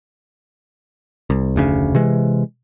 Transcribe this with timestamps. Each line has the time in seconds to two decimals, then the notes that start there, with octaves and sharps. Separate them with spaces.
1.30 C2
1.56 F1 D2 C#3
1.95 C3 E3 G#3